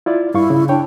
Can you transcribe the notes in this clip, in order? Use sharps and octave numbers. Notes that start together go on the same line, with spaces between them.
E4 F4 D5
G2 E4 F5 C#6
C#3
D4 C#5 G5